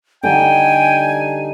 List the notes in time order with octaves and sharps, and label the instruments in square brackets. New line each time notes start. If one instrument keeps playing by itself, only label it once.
[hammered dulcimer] D3 G3 D#4 [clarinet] G5 [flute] G#5